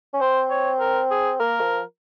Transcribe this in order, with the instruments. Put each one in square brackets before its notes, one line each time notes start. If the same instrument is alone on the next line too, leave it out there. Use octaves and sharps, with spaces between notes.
[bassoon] C#4
[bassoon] C4 [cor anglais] C5
[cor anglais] C#5
A#4
G#4
[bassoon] A#3 [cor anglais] A#4
[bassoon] F3